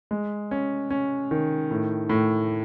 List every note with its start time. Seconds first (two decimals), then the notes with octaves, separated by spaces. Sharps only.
0.11 G#3
0.51 C#4
0.90 C#4
1.31 D#3
1.71 A2
2.10 A2